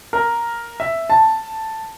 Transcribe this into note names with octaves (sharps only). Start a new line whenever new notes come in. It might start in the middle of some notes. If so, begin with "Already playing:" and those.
A#4
E5
A5